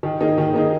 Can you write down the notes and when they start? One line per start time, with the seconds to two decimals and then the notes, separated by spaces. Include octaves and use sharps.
0.03 D#3
0.20 A#3 D#4 G#4
0.38 D#3
0.54 A#3 D#4 G#4